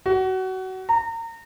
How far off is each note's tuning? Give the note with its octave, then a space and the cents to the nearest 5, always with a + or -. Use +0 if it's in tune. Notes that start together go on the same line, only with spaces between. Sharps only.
F#4 +25
A#5 -30